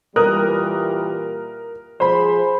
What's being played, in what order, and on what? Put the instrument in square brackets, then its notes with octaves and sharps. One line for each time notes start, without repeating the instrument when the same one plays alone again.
[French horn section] A#2 E3 G3 [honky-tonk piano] A#4 D#6 F#6
[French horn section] F3 G#4 [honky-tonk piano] C5 B5